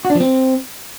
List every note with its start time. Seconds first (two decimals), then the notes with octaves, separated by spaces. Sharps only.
0.05 F#4
0.10 D4
0.15 F3
0.20 C4